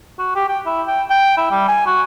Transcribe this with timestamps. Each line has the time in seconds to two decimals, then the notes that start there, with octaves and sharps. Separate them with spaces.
0.19 F#4
0.36 G4
0.49 G5
0.66 E4
0.88 G5
1.10 G5
1.38 E4
1.52 G3
1.68 G#5
1.87 F#4